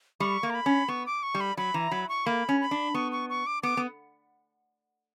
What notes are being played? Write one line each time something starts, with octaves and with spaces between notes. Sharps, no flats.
G3 C#6
A#3
A#5
B5
C#4
B3 C#6
D6
C#6
G3
B5
F#3 B5
E3 A#5
F#3 B5
C#6
A#3 B5
C#4
B5
D4
B3 C#6
C#6
C#6
D6
B3 D6
B3